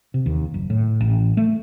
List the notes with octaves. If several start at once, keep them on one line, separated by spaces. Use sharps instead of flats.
C3
D#2
F#1
A2
A1
A3